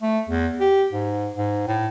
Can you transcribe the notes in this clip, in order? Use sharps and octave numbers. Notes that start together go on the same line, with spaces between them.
A3
E2
G4
G#2
G#2
A2